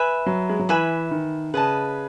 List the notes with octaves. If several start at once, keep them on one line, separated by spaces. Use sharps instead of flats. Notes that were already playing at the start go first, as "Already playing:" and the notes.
Already playing: B4 E5 G#5 B5
F#3
G#3
F#3
E3 B4 E5 G#5 B5
D#3
C#3 B4 D#5 A5